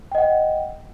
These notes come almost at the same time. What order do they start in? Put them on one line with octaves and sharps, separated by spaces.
G5 D#5 F#5